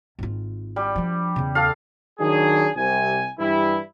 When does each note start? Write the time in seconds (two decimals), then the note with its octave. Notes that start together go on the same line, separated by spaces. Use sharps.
0.19 G#1 F4
0.76 G3
0.96 F3 D4
1.36 E2 C#3
1.55 A4 F5
2.19 D#3 F#3 D4 G#4
2.76 C2 C3 G#5
3.39 G2 E3 G3 E4